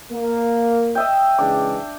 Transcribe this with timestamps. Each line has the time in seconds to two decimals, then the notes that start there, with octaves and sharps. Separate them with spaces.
0.12 A#3
0.95 D#5 E5 G5
1.38 C#3 E3 G#3 D4 D6